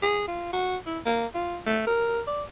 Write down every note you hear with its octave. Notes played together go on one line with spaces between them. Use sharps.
G#4
F4
F#4
E4
A#3
F4
A3
A#4
D5